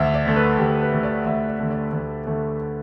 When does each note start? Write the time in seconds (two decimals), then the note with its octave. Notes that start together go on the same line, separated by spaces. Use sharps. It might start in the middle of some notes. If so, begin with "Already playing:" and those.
Already playing: D2 E5
0.14 D5
0.26 D3 A3
0.36 B4
0.58 D2 G4
0.82 B4
0.93 D3 A3
1.03 D5
1.26 D2 E5
1.48 D5
1.59 D3 A3
1.71 D5
1.93 D2
2.27 D3 A3